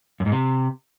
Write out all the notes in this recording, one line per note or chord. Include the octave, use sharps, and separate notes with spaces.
F#2
G#2
C3